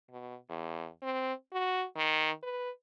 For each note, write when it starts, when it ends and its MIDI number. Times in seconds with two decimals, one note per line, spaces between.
0.10 0.35 47
0.49 0.87 40
1.02 1.33 60
1.53 1.84 66
1.96 2.31 51
2.43 2.70 71